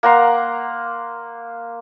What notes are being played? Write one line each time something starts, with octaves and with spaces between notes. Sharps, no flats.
A#3 F#5 A#5 C6